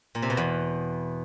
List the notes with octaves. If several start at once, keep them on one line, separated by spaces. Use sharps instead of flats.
A#2
C3
B2
E2